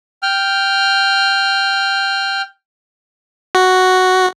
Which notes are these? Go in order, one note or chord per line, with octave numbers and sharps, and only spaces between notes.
G5 F6
F#4